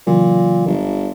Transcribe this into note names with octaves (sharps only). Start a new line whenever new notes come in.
A#2 C#3 E3 F#3
G1